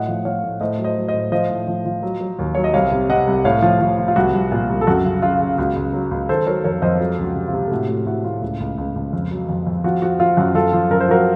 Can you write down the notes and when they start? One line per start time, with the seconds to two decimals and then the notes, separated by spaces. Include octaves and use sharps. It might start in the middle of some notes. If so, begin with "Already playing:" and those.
Already playing: A2 F#3 D#5 F#5
0.08 F3
0.25 F3 C#5 F5
0.43 A2
0.61 A2 C5 D#5
0.79 F#3
0.84 C5 D#5
0.96 F#3
1.08 C5 D#5
1.14 A2
1.32 F3 C5 D#5
1.50 A2
1.67 F3
1.85 F3
2.03 F#3
2.21 F#3
2.39 D#2
2.55 F#3 C#5
2.64 D#5
2.74 C2 C#5 F5
2.92 C3
3.09 C3 D#5 F#5
3.27 C2
3.45 A2 C#5 F5
3.62 F3
3.81 F3
3.98 F3
4.08 F4
4.16 C2 F#4
4.34 C2
4.52 A#2 F4
4.69 C2
4.81 A4
4.87 F#2 F#4
5.05 C#3
5.22 C#3 F4
5.40 C#3
5.58 C#2 F#4
5.76 C#2
5.93 F#3
6.11 C#2
6.29 D#3 A4 C5
6.47 F#3 A#4 C#5
6.64 F2 A#4 C#5
6.82 F2 C5 D#5
7.00 F#3 F4 A4
7.18 C#2
7.24 F#4
7.35 C3
7.48 F4
7.53 C3
7.66 A4
7.71 A2 F#4
7.89 A2 F#4
8.06 A2 F#4
8.25 A2 F4
8.42 C#2 F4
8.60 C#2
8.78 C#2
8.96 C#2
9.13 F2
9.31 F#3
9.49 F2
9.67 F2
9.84 F3 F#4
10.02 F3 F#4
10.20 F3 F4
10.37 F#2 F#4
10.55 F#2 F4 A4
10.73 F3
10.90 F#2 A#4
11.00 C5
11.08 F3 F#4 A#4